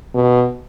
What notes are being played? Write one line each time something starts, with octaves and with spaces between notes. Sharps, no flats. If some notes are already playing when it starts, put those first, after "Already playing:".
B2